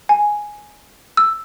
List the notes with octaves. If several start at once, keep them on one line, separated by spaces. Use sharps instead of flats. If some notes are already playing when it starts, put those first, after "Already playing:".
G#5
E6